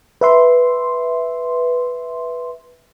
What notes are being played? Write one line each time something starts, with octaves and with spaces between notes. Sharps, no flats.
B4 E5 C6